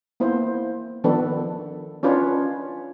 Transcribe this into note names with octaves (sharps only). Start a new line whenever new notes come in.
A#3 B3 E4 C5
D#3 F3 B3 D4 A4 B4
C#4 D4 F4 B4 C#5